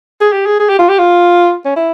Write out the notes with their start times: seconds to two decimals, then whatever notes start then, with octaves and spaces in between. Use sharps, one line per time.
0.21 G#4
0.32 G4
0.46 G#4
0.60 G#4
0.69 G4
0.79 F4
0.89 G4
0.99 F4
1.65 C#4
1.76 E4